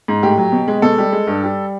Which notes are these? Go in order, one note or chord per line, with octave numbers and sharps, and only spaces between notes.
G#2
A2 G4
F#3
B2
G#3
B2 A4
G3
G#3
G2
G3